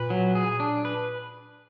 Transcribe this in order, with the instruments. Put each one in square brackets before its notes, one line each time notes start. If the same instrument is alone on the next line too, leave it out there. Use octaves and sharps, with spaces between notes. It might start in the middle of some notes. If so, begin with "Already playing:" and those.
Already playing: [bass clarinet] A#2 [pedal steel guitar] B4
[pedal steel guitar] F#3
G#4
D4
B4